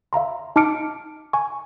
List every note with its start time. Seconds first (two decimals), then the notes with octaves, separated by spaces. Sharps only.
0.13 E5 F5 A#5 C6
0.56 D#4 A5 D6 F6 C#7 D7
1.33 G#5 C#6